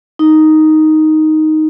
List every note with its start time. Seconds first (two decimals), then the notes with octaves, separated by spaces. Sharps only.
0.19 D#4